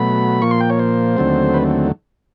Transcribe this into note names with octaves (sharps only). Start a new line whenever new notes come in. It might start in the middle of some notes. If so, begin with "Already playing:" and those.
Already playing: B2 F#3 A3 B5
A#2 F3 A#3 C#6
C6
G5
C#5
C5
D#2 D3 F#3 A3 C4
B4